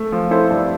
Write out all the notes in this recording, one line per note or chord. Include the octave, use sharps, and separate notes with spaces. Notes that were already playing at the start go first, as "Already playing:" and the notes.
Already playing: A3
F3
E4 A4 C5
G2